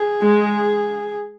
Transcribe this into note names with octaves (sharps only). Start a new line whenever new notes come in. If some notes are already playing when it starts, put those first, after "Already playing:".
Already playing: G#4
G#3